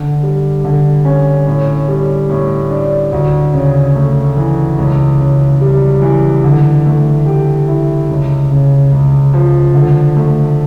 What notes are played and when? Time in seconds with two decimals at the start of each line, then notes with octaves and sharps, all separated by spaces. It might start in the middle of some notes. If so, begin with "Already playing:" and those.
Already playing: D3
0.23 G3
0.64 D3
1.05 C#4
1.47 A2
1.88 G3
2.30 A2
2.70 D4
3.12 D2
3.54 C#3
3.96 A3
4.37 E3
4.78 C#2
5.19 C#3
5.61 G3
6.02 E3
6.44 D3
6.85 A3
7.26 G4
7.68 E4
8.09 C#2
8.51 C#3
8.92 C#2
9.34 F3
9.74 D3
10.16 A3